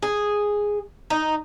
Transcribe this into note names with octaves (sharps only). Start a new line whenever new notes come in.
G#4
D#4